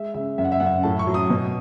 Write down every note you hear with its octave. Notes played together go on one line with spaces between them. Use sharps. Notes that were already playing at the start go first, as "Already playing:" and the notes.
Already playing: G#3 E5
C#3 E5
F#2 E5
F#5
E5
F#2 F#5
E5
A2 A5
C#6
F#3
D#6
B2